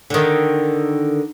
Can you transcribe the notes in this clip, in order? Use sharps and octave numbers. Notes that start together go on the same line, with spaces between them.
D3 D#3